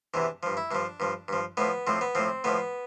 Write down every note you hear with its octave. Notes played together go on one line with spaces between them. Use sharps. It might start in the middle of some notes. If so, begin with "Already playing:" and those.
E2 C3 E3 D4
G2 F3
E4
G2 F3 D4
G2 F3
G2 F3
A2 F3 B3
A2 F3 C4
B3
A2 F3 C4
A2 F3 B3